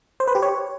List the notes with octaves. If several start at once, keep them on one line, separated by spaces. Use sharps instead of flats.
C5
B4
G4
C#5